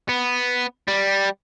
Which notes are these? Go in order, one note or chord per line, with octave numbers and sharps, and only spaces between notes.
B3
G3